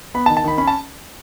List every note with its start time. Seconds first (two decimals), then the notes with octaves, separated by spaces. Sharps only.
0.14 B3 B5
0.26 A5
0.30 D#3
0.37 A5
0.44 D#3 B5
0.58 C#4 B5
0.67 A5